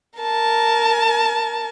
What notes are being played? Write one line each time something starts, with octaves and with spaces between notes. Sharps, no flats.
A#4 A5